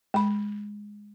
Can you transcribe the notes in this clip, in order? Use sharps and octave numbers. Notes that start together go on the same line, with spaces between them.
G#3 B5